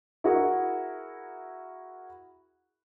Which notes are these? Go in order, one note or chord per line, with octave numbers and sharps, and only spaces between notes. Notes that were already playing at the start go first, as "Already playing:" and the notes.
E4 F#4 G#4 A#4